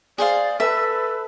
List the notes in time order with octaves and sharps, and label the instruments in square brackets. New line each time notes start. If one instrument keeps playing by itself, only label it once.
[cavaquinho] G#4 C5 F5 [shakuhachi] D5
[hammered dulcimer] A4 [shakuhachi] B4 [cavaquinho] E5